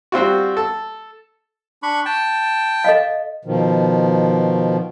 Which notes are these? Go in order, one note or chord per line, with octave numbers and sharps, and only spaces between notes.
G3 C4 F4 F#4
A4
D4 B5 C#6
G5 A5
A4 D#5 F5
B2 D#3 F3